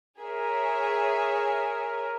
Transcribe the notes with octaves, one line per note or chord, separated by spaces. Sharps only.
G#4 A#4 C#5 E5 G#5